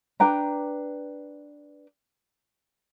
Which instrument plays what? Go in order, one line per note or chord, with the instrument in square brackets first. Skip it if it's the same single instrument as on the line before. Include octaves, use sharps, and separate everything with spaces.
[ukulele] D4 B4 G5 A#5